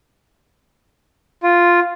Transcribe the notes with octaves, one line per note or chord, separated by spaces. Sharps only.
F4